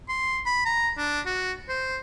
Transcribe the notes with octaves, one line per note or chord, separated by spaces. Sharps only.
C6
B5
A#5
D4
F#4
C5